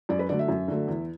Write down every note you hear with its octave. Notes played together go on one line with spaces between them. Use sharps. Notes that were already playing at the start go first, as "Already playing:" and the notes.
F#2 D5
B4
D3 F#3 A3 D5
E5
F#2
D3 F#3 A3
E2